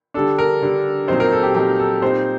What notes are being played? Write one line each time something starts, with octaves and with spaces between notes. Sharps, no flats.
D3 G3 D4 A4
A#4
D3 G3 D4
A#2 F#3 C4 D#4 C5
A#4
A4
G4
A#2 F#3 C4 D#4 G4
A4
A#2 G3 C4 D#4 C5